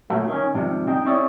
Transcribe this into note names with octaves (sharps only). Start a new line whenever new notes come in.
D#2 A#2 F#3 A3
D#3 C#4
G#2 C3 D#3 F3 G3
C4 D#4 D#5 G5
C4 E4 G#4 C#5 D5 E5